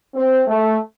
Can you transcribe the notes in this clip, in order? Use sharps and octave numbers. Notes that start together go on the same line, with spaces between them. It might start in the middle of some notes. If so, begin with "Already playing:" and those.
C4
A3